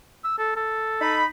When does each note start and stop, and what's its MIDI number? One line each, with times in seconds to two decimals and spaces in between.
0.24 0.35 88
0.38 0.54 69
0.56 1.19 69
1.01 1.26 63
1.01 1.26 83